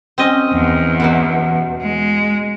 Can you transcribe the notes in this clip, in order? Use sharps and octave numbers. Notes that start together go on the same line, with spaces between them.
C4 C#4 D#5
E2
B2 E3 F#3
G#3